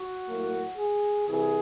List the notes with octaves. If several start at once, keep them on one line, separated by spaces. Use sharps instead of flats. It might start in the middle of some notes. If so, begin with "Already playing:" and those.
Already playing: F#4
A2 F#3 A#3
G#4
C2 C3 E3 G#4